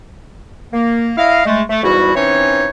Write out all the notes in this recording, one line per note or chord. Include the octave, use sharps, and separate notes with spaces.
A#3
E4 D#5 F5
G#3 A3
A3
E2 G#2 G3 E4 F#4
E3 C4 C#4 D#4 C#5